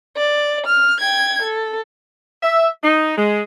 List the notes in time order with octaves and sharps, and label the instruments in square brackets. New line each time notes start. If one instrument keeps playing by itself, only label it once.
[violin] D5
F6
G5 G#6
A4
[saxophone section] E5
D#4
G#3